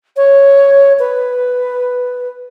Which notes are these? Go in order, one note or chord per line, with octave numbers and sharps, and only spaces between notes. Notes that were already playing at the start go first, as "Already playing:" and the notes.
C#5
B4